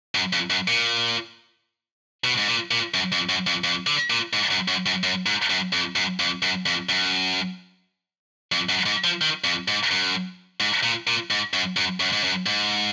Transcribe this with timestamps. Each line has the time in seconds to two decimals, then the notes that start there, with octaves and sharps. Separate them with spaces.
0.15 F#2
0.33 F2
0.50 F#2
0.68 A#2
2.25 B2
2.38 G#2
2.48 A#2
2.71 A#2
2.94 F#2
3.12 F2
3.29 F#2
3.47 F2
3.64 F2
3.87 D3
4.10 A#2
4.33 G#2
4.51 F#2
4.68 F#2
4.86 F#2
5.03 F#2
5.26 G#2
5.50 F#2
5.73 F2
5.96 F#2
6.20 F2
6.42 F#2
6.66 F2
6.89 F#2
8.52 F2
8.69 F#2
8.86 G#2
9.04 F3
9.21 D#3
9.44 F2
9.68 G#2
9.91 F#2
10.60 G#2
10.84 A#2
11.07 A#2
11.31 G#2
11.53 F#2
11.77 F#2
12.00 F#2
12.13 G#2
12.23 F#2
12.46 G#2